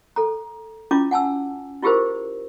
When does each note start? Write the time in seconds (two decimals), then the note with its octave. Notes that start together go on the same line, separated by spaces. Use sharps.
0.16 A4 A#5
0.91 C#4 E4 F4 D6
1.11 F#5 G#5 A5 E6
1.82 E4 F4 G4 G#4 A#4 C5